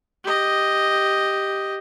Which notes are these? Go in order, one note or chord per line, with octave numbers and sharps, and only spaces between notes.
G4 D#5